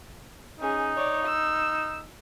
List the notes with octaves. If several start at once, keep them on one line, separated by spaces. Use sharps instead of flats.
C#4 D#4 G#4
C#5 D5
E6